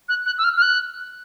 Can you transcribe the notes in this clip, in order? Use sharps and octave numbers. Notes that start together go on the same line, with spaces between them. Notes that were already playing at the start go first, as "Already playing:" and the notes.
F#6
F#6
E6
F6
F6
F#6